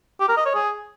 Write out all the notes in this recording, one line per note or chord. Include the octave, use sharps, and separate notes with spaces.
G4
A#4
D#5
C#5
G#4